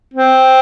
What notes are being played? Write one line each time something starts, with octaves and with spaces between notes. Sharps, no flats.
C4